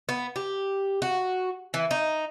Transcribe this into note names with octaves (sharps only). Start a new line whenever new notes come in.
B3
G4
F#4
E3
D#4